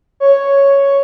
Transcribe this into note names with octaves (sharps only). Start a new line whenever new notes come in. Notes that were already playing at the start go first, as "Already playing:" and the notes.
C#5